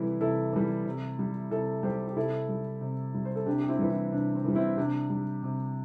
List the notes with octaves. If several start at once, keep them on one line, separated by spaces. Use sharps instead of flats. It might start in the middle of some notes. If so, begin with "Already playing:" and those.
Already playing: C3 E3 G3 E4 A4
C3 E4 A4
E3 G3
C3
G3
C3 E4 A4
G3 G4 C5
G4
C3 E4 A4
G3
C3
G3
C5
A4
C3 D4 G4
G4
C4 E4
E3 G3
C4 E4
C3 D4
C4
E3 G3
C4 E4
C3 D4 G4
G3
C3